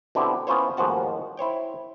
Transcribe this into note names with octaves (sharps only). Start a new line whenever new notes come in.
B2 D3 C4 E4 G4
B3 C#4 E4 F4 C5 C#5
A1 D#2 G#2 F3 F#4 A5
E4 C5 C#5 G5